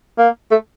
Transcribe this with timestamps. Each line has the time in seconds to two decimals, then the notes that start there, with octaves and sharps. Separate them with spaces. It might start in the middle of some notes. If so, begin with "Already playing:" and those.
0.18 A#3
0.51 A3